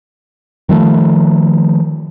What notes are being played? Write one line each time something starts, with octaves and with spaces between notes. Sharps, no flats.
D#3 F3 G3 A3